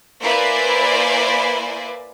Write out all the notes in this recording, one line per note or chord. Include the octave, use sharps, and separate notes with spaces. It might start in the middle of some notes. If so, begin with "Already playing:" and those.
A#3 E4 B4 C5 D5 G#5